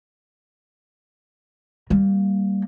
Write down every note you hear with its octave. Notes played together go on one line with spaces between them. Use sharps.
G3 A#3